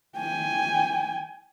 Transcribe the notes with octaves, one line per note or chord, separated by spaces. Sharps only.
G5 G#5